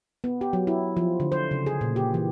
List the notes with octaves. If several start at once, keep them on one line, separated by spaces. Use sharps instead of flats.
B3
G4
F#3
E4
F3
D3
C5
C#3
G#4
A#2
G4
E3